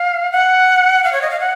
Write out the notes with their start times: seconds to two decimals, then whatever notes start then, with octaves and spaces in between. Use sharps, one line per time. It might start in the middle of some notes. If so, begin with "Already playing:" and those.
Already playing: F5
0.32 F#5
1.04 F5
1.13 C#5
1.22 D#5
1.30 F5
1.40 F#5